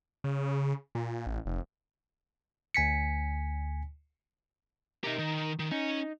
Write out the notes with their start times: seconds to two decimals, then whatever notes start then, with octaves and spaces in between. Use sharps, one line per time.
0.24 C#3
0.95 A#2
1.27 A1
1.46 F1
2.75 D2 G#5 B6 C#7
5.04 D#4 G4 A#4 E5
5.19 D#3
5.59 D#3
5.72 C#4 D#4